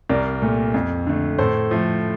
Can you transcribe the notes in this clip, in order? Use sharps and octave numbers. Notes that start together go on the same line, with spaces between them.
C2 A#4 D5
A#2 A3
F2
D3 A3
A2 A4 C5
F3 A3